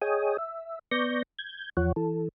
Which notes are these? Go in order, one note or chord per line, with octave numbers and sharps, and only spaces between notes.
G#4 C#5 D#5 G5 G#5 D#6
E5
B3 D5 C#6 G6 A#6
G6 G#6
E2 F3 C#5 F#5
E3 A4